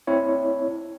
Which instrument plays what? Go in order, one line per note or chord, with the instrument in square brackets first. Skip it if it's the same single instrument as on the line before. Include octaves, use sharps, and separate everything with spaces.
[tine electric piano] C4 E4 C#5